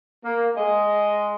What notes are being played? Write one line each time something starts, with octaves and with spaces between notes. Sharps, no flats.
A#3
G#3 D#5